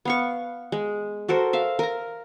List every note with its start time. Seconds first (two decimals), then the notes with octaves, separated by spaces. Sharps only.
0.05 B3 F5 C#6
0.72 G#3
1.28 F#4 A4 A#4 C5
1.53 E5 F5
1.79 A#4 A#5